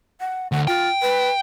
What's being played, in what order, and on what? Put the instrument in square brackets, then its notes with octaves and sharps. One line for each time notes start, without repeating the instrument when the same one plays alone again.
[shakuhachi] F#5
[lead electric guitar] D2 [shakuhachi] F#5
[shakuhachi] F4 [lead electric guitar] G5
[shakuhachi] B4